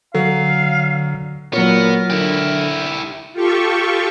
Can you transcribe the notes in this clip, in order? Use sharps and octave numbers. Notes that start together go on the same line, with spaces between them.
D3 F#3 F5
A#2 F#3 B3 A#4 C#5
D3 E4 G4
F4 G4 A4 C#6